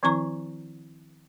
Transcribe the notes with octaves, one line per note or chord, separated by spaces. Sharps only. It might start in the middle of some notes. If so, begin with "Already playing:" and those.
D#3 F3 C4 E4 A#5 C#6